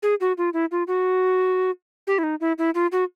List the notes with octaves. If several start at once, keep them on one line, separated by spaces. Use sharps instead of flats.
G#4
F#4
F4
E4
F4
F#4
G4
E4
D#4
E4
E4
F4
F#4